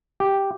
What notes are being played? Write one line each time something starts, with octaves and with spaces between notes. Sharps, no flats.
G4